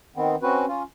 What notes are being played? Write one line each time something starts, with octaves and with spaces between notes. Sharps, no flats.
D#3 B3 C4
C4 C#4 F#4 B4
C#4 F4